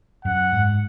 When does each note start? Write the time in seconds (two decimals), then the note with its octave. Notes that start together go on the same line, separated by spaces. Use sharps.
0.25 F#2 F#5
0.52 G#2